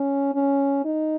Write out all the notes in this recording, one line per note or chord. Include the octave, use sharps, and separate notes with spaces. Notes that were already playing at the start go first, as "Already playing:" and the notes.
Already playing: C#4
C#4
D#4